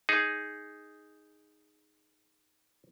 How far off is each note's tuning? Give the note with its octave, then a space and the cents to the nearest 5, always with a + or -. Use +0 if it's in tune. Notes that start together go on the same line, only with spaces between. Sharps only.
D#4 +0 G#4 +0